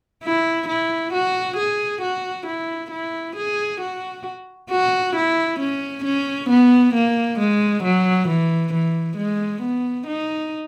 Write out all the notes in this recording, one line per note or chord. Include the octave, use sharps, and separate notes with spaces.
E4
E4
F#4
G#4
F#4
E4
E4
G#4
F#4
F#4
E4
C#4
C#4
B3
A#3
G#3
F#3
E3
E3
G#3
B3
D#4